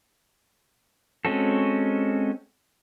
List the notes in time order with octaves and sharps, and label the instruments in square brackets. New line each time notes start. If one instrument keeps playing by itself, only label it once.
[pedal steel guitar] G#3 C4 C#4 F#4 A4